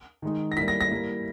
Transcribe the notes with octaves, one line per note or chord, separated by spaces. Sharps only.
D#3 G#3 D#4
A#6
G3 A#3 E4 B6
A#6
A#6
G3 A#3 E4